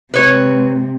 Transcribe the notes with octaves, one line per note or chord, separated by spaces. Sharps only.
C3 G#3 B4 C#5